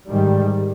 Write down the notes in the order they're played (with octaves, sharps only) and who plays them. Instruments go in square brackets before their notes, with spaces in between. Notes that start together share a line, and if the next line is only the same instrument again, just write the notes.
[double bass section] G#2 D#3 G3